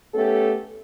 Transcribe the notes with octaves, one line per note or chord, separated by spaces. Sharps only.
A3 B3 C#4 G4 A4